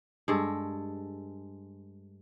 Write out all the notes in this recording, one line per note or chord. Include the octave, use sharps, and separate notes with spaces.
G2 G#3 A4